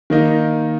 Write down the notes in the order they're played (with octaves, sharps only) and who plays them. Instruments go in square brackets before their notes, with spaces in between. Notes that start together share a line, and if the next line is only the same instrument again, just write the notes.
[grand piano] D#3 A#3 D#4